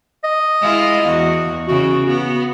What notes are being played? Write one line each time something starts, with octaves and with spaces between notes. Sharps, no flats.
D#5
G#3 E4 F4
E2 F#4
C#3 E3 F#4
B3 F#4